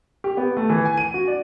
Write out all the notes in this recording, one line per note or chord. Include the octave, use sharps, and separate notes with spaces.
G4
B3
A3
E3
G#5
D#7
F#4
D5